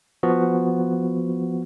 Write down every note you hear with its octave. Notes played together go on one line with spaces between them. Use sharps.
F3 B3 F#4